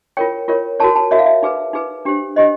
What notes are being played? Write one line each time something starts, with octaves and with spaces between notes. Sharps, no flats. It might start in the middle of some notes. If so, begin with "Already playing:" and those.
F4 A#4 C#5 G5
F4 A#4 C#5
F#4 A#4 C#5 A5
A5
F#4 A#4 C#5 E5
F5
E5
D#4 G#4 B4
D#4 G#4 B4
D4 G4 C5
D4 G4 C5 D#5